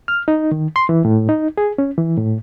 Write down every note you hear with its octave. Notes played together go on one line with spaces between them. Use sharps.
F6
D#4
D#3
C6
E3
A2
D#4
G#4
C#4
E3
A2